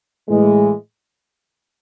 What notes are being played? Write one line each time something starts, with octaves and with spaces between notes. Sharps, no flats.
A2 E3 G#3